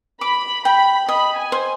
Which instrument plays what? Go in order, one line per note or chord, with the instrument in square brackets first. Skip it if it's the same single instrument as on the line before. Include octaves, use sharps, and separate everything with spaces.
[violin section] B5 [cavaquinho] D6
[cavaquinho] G5 [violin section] B5
[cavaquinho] D#5 [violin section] B5
[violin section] G#5
[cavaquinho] C5